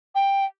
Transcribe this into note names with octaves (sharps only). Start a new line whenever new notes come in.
G5